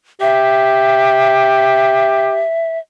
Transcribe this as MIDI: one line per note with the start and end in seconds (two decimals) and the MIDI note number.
0.21 2.43 67
0.21 2.79 76